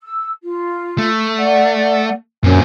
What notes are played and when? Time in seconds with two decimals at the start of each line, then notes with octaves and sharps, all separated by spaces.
0.01 E6
0.43 F4
0.98 A3
1.38 D5 F#5
2.44 F#2 A#2 C4 G#5